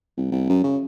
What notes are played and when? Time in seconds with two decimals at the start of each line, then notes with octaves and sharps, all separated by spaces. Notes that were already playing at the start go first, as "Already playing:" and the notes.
0.18 C2
0.32 C2
0.49 F#2
0.64 C#3